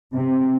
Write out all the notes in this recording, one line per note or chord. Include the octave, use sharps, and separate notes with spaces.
C3